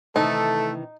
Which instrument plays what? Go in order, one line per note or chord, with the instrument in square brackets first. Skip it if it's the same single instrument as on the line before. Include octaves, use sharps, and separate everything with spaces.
[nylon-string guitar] C3 D#3 E3 [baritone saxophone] A3 [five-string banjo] D#4 [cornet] A4